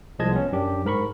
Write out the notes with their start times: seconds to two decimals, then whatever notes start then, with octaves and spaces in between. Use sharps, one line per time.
0.19 C2 F3 G#3 D#5 A5 G#6
0.32 B3 C#4
0.52 F#2 D4 G4
0.85 G#2 A#4 B5 C#6